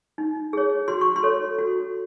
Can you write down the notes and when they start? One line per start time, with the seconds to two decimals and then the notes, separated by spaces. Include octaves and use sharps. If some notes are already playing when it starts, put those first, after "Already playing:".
0.18 D#4
0.53 G#4 C#5
0.88 F#4 C6
1.01 C#6
1.16 C6
1.23 A4 C#5
1.59 F#4